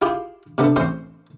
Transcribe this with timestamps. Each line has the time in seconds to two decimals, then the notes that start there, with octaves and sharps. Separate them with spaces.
0.02 E4 F4 G4 G#4
0.58 C3 B3 D4 A4
0.76 A1 C4 C#4 C5 C6